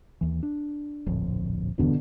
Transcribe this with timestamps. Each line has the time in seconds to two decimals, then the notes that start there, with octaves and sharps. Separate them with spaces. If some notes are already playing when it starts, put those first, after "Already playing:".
0.21 D#2 E3
0.43 D4
1.06 D1 A#1 F2
1.78 D#1 E2 G2 B2 D3